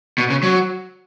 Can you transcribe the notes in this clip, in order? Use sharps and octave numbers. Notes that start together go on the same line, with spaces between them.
B2
C#3
F#3